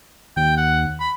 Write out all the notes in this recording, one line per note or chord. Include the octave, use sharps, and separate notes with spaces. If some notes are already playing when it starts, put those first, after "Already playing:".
D#2 G5
F#5
B5